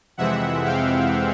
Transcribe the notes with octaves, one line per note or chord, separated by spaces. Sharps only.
F2 C3 E3 G#3 C4 E5 F#5
F5 G5